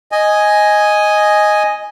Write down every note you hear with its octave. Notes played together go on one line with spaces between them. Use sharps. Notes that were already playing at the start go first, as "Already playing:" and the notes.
D#5 G#5